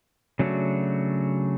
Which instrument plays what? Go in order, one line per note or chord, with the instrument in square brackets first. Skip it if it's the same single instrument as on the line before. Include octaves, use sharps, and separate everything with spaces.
[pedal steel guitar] C#3 F#3 A3 D4 F#4